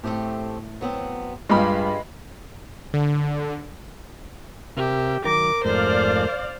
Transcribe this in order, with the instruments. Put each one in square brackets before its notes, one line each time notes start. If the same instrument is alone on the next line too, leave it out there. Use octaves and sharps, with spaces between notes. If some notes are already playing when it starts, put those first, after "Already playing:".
[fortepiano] A2 [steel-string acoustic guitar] A3 C4 G4
[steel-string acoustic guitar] F#3 B3 C4
[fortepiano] G2 F4 F6 [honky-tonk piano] G#3 B5 [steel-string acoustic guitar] D4 G4 G#4
[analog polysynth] D3
[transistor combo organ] C3 A#4 E5 [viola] G4
[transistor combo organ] D#3 F#3 [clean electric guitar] A#4 [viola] D6
[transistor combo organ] F2 G#2 A3 [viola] C5 [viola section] D5 F5